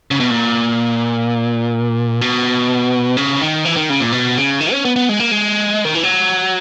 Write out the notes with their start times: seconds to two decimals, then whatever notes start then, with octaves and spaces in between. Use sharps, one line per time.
0.11 C#3
0.20 B2
0.30 A#2
2.21 B2
3.17 C#3
3.41 D#3
3.65 E3
3.76 D#3
3.90 C#3
4.00 A#2
4.12 B2
4.37 C#3
4.61 D#3
4.72 C#4
4.85 B3
4.96 B3
5.09 G#3
5.20 A#3
5.31 G#3
5.85 D#3
5.95 E3
6.03 F#3